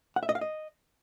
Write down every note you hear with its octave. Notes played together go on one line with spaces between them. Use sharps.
F#5
E5
D#5
F5
D#5